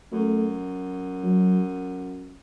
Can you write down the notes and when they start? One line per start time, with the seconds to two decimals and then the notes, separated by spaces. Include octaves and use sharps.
0.12 F#2 A3
1.23 F#3